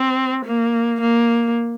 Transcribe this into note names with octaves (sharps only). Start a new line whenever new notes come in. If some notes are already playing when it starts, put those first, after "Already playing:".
Already playing: C4
A#3
A#3